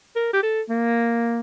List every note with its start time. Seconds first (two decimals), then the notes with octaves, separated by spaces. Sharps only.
0.16 A#4
0.33 G4
0.43 A4
0.69 A#3